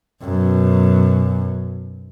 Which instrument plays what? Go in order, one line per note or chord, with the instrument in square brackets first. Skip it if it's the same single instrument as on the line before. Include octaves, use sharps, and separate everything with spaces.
[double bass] F#2 B2